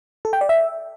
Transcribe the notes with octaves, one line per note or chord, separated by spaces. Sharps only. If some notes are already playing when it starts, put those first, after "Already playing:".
A4
G5
D5
E5